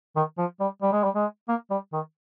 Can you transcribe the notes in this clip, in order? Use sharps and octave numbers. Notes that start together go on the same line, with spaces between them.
D#3
F3
G3
G3
G#3
G3
G#3
A#3
G3
D#3